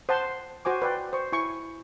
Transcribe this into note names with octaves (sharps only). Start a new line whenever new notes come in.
C5 F#5 A5 C6
F#4 C5 G#5 D6
B4 D5 G5 C6
C5 C#6
E4 G#5 C#6